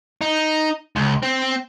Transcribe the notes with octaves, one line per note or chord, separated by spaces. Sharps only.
D#4
C#2
C4